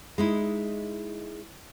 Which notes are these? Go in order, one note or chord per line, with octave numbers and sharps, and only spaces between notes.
G#3 D#4 E4